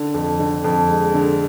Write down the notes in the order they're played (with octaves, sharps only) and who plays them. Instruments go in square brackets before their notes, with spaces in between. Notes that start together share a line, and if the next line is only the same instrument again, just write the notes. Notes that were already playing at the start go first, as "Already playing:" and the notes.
Already playing: [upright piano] D3
F2
D3
F2
G#3
D3